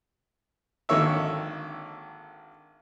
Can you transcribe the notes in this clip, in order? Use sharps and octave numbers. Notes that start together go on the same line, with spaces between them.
G#1 D3 D#3 A#3 C#5 E5